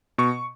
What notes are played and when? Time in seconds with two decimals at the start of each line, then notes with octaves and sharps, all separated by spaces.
0.18 B2 C#6